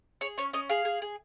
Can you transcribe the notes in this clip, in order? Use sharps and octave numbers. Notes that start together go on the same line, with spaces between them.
G#4 C#5
C#4 C#5
C#4 D#5
G#4 F5
G#4
G#4